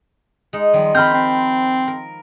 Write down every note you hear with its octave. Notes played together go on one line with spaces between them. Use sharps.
G#3 D#4
D#3 F3 G3
C4 A#5 B5 F6 G6
C4
A#4